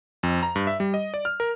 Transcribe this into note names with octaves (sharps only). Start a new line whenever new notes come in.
F2
A#5
G2
E5
G3
D#5
D5
F6
A#4